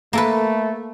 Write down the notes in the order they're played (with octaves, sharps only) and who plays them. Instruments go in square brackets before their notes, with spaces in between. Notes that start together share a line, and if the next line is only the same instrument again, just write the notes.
[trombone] A3 [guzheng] A#3 A4 B4